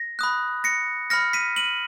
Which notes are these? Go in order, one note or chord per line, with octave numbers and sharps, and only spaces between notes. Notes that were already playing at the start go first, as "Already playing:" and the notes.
Already playing: A#6
B5 D#6 F#6
A#6 C#7
B5 F6 A#6 C#7
B6 D#7
D#7 F#7